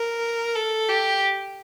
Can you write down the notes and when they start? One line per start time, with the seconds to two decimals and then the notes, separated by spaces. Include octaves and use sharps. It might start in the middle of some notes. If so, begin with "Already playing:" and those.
Already playing: A#4
0.55 A4
0.89 G4